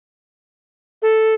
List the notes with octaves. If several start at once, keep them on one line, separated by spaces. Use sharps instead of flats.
A4